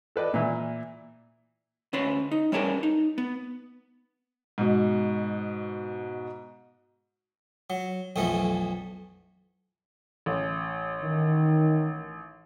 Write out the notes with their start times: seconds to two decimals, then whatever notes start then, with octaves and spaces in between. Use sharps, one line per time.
0.16 A4 B4 D5 D#5
0.34 A#2 E3
1.93 D2 C#4 B4 C6
2.31 D#4
2.52 G3 C#4 D4 G#4 A#4 B4
2.83 D#4
3.18 B3
4.58 G#2 B2
7.70 F#3
8.16 B1 F2 E3 A3
10.26 A1
11.02 D#3